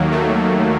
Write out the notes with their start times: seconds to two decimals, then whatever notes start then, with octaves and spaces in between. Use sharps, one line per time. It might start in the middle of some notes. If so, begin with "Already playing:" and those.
Already playing: D#2 D#3 F#3 A#3
0.11 A3